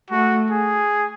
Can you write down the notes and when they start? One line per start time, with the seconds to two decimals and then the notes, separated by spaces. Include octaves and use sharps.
0.10 A3 F#4
0.51 G#4